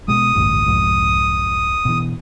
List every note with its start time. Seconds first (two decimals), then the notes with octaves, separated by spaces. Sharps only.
0.08 B2 G#3 D#6
0.36 A1 D2 G2
0.66 C2 F2 G#2
1.85 B2 E3